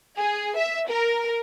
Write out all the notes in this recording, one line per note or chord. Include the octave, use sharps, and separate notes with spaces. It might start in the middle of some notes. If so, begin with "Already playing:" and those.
G#4
E5
A#4